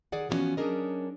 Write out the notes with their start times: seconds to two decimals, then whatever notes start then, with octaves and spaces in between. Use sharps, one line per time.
0.12 D#3 G#4 D5 F#5
0.29 E3 F3 G3 B3 C#4 F#4
0.57 F#3 C#4 D4 G#4 A#4 D#5